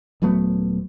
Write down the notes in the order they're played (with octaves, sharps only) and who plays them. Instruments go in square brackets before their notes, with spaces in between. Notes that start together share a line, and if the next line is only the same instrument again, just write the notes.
[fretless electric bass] D#1 F#3 A3 B3